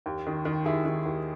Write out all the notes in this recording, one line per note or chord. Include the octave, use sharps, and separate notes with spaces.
D#2
D#3
D#3
D#2 E4 G#4
D#3
D#2